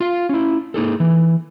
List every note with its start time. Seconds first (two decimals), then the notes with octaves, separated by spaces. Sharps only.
0.01 F4 F5
0.29 C#4 E4
0.74 A#3 D#4 G#4 A4
1.00 E3